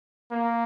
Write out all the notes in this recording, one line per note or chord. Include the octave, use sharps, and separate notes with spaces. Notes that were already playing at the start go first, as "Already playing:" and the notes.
A#3